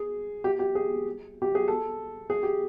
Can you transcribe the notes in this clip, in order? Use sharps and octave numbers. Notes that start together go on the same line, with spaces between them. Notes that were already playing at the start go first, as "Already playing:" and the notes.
Already playing: G#4
G4
G4
G#4
G4
G#4
A4
G#4
G4